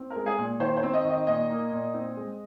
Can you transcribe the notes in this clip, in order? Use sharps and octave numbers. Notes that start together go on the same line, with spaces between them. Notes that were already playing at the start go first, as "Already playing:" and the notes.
Already playing: C4
G#3 A#4
G#4
A#2
D#3 C5
C5
C4
D#5
D#3
D#5
A#2 D#5
A#3
A#2
C4
G#3